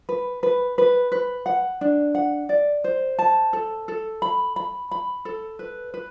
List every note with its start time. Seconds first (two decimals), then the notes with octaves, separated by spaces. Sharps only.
0.09 B4
0.43 B4
0.78 B4
1.12 B4
1.46 F#5
1.81 D4
2.15 F#5
2.49 D5
2.84 C5
3.19 A5
3.53 A4
3.88 A4
4.22 B5
4.56 B5
4.91 B5
5.25 A4
5.59 B4
5.94 B4